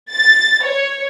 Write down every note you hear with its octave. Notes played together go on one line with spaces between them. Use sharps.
A6
C#5